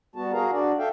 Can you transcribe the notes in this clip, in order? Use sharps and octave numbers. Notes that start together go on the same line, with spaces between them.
G3 B3 F#4 A5
F#4 G#4 A#4 F5 A#5
D4 F#4 D5
A4 E5 F5 G5